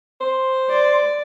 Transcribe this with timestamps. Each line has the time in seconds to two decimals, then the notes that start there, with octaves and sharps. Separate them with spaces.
0.21 C5
0.68 D5